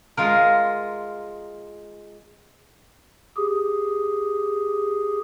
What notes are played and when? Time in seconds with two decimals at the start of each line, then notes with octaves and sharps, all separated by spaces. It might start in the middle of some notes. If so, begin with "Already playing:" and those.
0.17 G#3 F4 A#4
3.37 G4 G#4